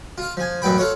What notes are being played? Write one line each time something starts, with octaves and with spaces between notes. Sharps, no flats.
F4 F5
F3 G#5
A1 F#2 B3 G5 B5
F4 A4 C#5 F#5